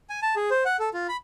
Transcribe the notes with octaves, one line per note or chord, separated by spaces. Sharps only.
G#5
A5
G#4
C5
F#5
A4
F4
B5